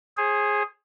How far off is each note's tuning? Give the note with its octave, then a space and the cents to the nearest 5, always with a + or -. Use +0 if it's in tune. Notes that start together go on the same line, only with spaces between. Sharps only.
G#4 +0 C5 +40